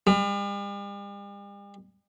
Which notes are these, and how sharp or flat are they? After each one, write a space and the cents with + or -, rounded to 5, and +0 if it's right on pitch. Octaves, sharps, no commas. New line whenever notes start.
G3 +45